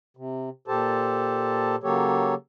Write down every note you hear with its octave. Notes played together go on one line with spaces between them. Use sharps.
C3
A#2 G4 A4 C5 A5
C#3 F#3 A#3 G4 A4 C#5